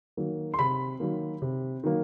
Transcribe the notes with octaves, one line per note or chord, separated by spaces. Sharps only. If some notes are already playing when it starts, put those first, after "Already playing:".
D#3 F#3 A#3
C6
C3 B5
D#3 F#3 A#3
C3
D#3 F#3 A#3